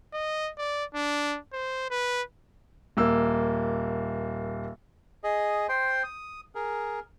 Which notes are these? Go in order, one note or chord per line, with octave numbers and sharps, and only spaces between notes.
D#5
D5
D4
C5
B4
D#1 A#3 E6
G#4 D#5
C5 G5 C6
D#6
G#4 A#4